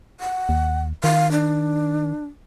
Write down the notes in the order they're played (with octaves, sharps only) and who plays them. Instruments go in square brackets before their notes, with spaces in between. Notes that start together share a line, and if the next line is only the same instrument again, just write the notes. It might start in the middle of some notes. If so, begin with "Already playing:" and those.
[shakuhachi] F#5
[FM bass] D#2
[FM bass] D#3 [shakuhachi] F5
[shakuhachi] D4